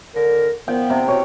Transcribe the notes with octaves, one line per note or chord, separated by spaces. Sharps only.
D#2 D3 A#4
A#2 F3 B3 G5
C3
B2 C#5